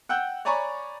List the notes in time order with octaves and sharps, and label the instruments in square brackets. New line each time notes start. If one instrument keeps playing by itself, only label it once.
[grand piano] F#5 G5 E6 F#6 G6
C#5 D5 G#5 A#5 B5 C#6